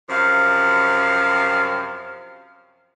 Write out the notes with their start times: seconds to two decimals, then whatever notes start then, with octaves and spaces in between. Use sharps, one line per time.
0.09 F#2 C3 F3 F5